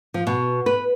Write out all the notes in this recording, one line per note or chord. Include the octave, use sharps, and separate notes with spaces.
F3
B2
B4